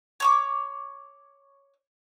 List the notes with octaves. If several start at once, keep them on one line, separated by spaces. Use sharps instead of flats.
C#5 C#6 D6